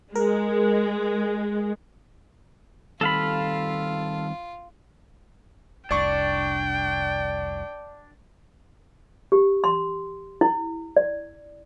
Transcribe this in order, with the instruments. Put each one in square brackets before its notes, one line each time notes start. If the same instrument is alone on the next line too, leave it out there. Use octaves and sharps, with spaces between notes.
[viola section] G#3 [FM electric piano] A#4
[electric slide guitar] D#3 G3 C4 [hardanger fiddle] F4 [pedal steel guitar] A4 F5 B5
[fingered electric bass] F1 C2 [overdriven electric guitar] D4 [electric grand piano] D5 C#6 [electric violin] G5
[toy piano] G4
C6
E4
D5